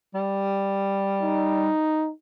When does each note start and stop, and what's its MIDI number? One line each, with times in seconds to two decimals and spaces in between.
0.15 1.70 55
1.23 2.11 63